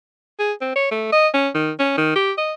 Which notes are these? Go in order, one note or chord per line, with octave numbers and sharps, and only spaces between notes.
G#4
C4
C#5
A3
D#5
C#4
D#3
C#4
D#3
G4
D#5